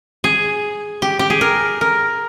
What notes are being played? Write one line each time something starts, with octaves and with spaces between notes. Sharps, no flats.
G#4
G4
G4
G#4
A#4
A#4